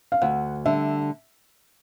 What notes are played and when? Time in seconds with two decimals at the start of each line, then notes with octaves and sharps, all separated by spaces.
0.12 F5
0.22 D2 F#5
0.66 D3 G3 E5